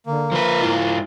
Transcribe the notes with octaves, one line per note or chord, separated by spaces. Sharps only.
D3 A#3
F3 B4
G#2 E4 F4